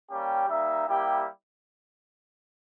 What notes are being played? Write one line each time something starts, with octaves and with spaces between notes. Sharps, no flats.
G3 A#3 C#4 G4 G5
G3 A#3 D#4 E5
G3 A#3 E4 G4 G5